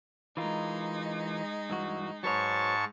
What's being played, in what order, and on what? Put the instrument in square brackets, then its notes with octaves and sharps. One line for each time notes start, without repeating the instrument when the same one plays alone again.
[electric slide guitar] E3 F4 A#4 [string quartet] G#3 D#4
[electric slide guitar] G2 E3 F#4
[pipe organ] G#2 A5 C#6 [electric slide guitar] F#3 B4 C#5